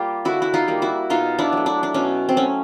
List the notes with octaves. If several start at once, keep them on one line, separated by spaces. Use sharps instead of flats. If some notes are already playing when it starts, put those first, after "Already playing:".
Already playing: G3 A#3 F4 G4
D3 E4 F#4
E4
D#4 F4
G3 A#3
E4 F#4
B2 D#4 F4
D4 E4
F#3 A3
D4 E4
D4
B2 C#4
C4
F#3 A3 C#4